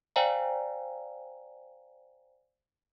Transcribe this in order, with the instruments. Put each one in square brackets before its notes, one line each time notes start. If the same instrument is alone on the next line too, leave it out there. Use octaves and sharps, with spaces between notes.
[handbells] C5 D5 F5 G5 G#5 A#5